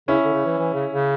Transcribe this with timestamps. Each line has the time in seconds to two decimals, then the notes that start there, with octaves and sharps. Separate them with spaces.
0.08 C#3 C#4 E4
0.24 D3
0.33 C#3
0.46 E3
0.58 E3
0.74 C#3
0.91 C#3